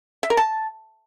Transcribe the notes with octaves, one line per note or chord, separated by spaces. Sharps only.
E5
A#4
A5